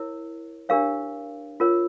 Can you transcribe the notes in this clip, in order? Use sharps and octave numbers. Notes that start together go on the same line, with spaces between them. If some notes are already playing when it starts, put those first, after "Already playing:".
Already playing: E4 A#4 C#5
D4 G4 A#4 C#5 F5
F4 A#4 C#5